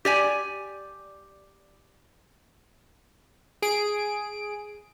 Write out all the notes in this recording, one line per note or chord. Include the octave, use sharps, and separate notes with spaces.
G4 D5 G#5
G#4 D7